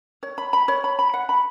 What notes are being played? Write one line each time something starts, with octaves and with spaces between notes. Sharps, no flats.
C#5
B5
B5
C#5
B5
B5
F#5
B5